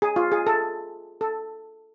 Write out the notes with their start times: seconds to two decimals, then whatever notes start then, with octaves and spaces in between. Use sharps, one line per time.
0.02 G#4
0.16 F4
0.32 G#4
0.47 A4
1.21 A4